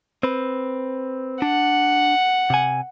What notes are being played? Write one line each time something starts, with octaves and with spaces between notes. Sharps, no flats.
C4 B4
D4 F#5
C3 G#5